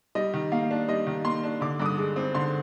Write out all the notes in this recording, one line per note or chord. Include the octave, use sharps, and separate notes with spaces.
G3 D#5
D#3
A#3 F5
D4
G3 D#5
D#3
A#3 C6
D4
D3 D6
G2 D6
D#6
G#3
C4
D3 C6